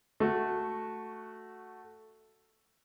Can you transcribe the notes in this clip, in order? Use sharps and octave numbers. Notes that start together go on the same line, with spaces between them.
A3 F#4